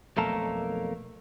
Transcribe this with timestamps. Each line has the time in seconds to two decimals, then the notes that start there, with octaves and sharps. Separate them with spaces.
0.17 B1 F2 A3 A#3 A#4 A5